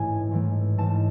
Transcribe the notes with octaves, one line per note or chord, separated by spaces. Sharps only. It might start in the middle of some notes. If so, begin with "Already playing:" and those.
Already playing: A1 G#2 E3 A3 G#5
A1 G#2 E3 A3
A1 G#2 E3 A3 A5